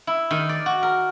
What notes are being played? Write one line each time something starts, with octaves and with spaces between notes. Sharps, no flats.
E4
D#3
D5
F#4
A#4